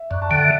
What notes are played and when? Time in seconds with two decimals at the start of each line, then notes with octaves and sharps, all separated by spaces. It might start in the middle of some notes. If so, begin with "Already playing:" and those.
Already playing: E5
0.10 F#2 D5
0.22 A5
0.29 D3 G5
0.37 F#5
0.44 E5